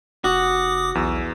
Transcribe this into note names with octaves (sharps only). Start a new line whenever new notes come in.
F1 F#4 D6 D#6
B1 E2 E6